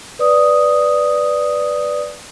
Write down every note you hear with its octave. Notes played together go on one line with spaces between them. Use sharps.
B4 D5 D#6